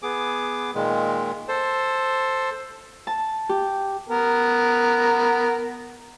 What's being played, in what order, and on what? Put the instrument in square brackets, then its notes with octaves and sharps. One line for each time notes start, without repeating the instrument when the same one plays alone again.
[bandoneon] B3 G#4 D6
A#2 D#3 G#3
A4 C5
[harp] A5
G4
[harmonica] B3 A#4